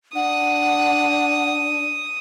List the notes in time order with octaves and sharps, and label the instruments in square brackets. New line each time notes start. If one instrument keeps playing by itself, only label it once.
[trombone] D4 [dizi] F#5 [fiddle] D#6